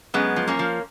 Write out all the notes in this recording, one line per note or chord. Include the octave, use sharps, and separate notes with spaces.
F#2 G#3 B3
F3
A#3 C#4
F3